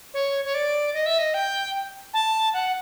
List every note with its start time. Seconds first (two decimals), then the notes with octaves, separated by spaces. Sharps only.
0.14 C#5
0.45 C#5
0.54 D5
0.94 D#5
1.06 E5
1.19 D#5
1.34 G5
2.14 A5
2.54 F#5